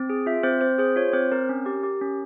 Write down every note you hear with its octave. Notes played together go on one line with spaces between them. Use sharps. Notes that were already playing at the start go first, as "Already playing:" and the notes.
Already playing: C4
G#4
F4 E5
C4 C5
C4 C5
G#4 C5
F4 C#5
C4 C5
C4 A#4
C#4
G4
G4
C#4